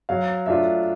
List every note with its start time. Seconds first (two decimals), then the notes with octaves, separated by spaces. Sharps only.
0.09 F#3 F5
0.46 A3 D4 F4 E5